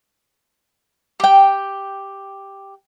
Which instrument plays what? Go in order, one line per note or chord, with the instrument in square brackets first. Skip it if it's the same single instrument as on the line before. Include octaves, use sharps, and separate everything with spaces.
[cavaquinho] G4 G5